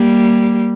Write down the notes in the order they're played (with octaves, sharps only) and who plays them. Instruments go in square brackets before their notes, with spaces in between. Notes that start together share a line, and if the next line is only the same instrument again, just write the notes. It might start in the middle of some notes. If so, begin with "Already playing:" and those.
Already playing: [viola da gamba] G3 A#3